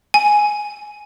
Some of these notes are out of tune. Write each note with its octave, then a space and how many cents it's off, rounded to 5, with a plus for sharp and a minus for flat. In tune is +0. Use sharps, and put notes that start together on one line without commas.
G#5 +5